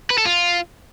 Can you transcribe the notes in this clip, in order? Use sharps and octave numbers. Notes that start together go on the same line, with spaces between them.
B4
A4
F4